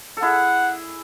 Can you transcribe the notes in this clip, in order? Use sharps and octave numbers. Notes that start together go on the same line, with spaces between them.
A4
E4 G#4 F#5